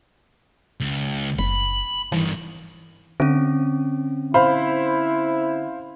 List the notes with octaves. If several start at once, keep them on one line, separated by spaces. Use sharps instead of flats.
C#2
F#1 B5
G2 D#3 E3
D3 C4 C#4
E4 C5 F5 B5